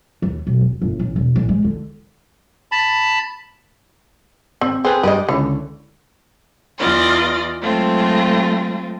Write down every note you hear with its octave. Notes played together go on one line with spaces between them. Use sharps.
D#2
B1
E1
G1
A1
E1
A1
G#3
D3
A5 B5
G#1 C4
C4 G#4 A4 B4
G2 G3 G#3 B4 D#5
C#2 D3 E3 C#5
E2 E3 F4 D5 D#5
F#3 G#3 A3 C4 F4